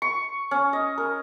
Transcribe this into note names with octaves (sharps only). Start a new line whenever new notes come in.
C#6
C#4
D#5
A#4